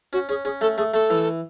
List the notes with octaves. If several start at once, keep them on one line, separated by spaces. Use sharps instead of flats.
C#4 F#4
C#4 G#4
C#4 G#4
A3 A4
A3 G#4
A3 A4
E3